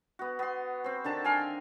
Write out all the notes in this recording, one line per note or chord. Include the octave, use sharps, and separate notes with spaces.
B3 F#4
B3 C6
C4 C5
D3 D#3 A5 A#5
A#4 F5 G5 G#5